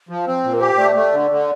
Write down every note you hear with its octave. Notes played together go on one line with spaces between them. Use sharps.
F3
C4 C5
A#2
A#4
G4 C5
A3 D5
A3
D3
D3